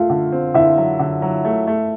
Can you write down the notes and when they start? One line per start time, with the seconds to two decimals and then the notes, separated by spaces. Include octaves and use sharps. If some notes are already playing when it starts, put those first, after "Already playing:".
Already playing: A3 F4 F5
0.10 D3
0.32 C4
0.54 D3 E4 E5
0.77 F#3
1.00 D3
1.22 F#3
1.45 A3
1.67 A3